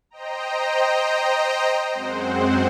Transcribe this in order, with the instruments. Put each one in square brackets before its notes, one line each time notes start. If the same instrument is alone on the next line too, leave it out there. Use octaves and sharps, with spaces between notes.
[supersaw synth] C5 D#5 G5 A#5
F#2 G#3 C4 C5 F#5